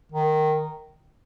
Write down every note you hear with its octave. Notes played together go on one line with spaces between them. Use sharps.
D#3